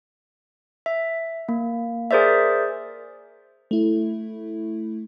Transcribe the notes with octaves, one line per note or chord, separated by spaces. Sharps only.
E5
A#3
G#4 A#4 C5 D5 E5
A3 E4